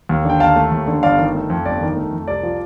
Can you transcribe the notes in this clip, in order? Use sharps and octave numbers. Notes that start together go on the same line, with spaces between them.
D#2
D3 G5
D#2 F5 A5
A3
D#2
D3
G1 D5 F5
D#3
A3
F2
G1 D5
D#3
A3
F2
C2 D5
F3